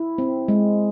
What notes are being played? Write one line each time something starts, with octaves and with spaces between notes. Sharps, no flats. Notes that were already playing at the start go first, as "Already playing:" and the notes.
Already playing: E4
C4
G#3